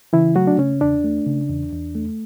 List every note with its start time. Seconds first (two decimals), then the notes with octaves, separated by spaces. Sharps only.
0.13 C#3 E3 E4
0.36 F#3 A3 F#4
0.47 D4
0.58 C#3 C#4
0.81 E2 D4
1.04 A3
1.26 C#3
1.50 E2
1.72 E2
1.95 A3